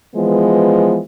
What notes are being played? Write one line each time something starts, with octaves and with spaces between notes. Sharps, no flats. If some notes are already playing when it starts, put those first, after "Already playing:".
E3 F3 G#3 B3